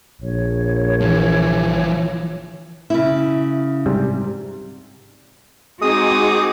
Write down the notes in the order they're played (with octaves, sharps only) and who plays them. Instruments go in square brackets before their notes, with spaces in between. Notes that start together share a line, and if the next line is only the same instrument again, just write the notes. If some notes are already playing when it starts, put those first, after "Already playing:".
[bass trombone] A#1 [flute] C#5
[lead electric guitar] E3 F3
[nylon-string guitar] C#3 E4
[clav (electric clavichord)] G#2 C3 G3
[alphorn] G#3 [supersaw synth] C4 G#4 D6 [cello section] D#4 F#4 [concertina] D#6